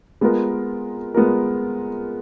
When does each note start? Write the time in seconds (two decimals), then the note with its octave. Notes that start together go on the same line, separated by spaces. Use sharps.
0.21 G#3 B3 F4 A#4
1.14 G#3 B3 F4 A#4